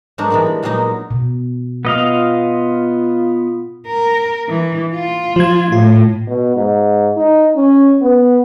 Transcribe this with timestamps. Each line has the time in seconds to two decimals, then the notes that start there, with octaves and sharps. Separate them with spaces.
0.18 G#2 F#3 B3 D4 D#4 A#4
0.30 E3 G3 G#3 B3 D4
0.46 B5
0.63 A#2 F#3 G#3 B3 D#4
1.11 B2
1.85 B3 F4 D#5 F5
3.87 A#4
4.49 E3
4.95 F4
5.36 F3 G#6
5.72 A2 F4
6.27 B2
6.56 G#2
7.16 D#4
7.56 C#4
8.02 B3